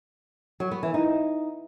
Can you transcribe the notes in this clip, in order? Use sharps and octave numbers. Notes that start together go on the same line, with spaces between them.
F#3
B3
E3
D#4